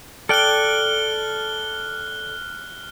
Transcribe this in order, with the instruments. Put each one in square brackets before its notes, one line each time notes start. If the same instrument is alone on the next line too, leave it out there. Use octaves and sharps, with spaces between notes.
[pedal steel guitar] A4 D5 G5 [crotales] F6 F#6 G7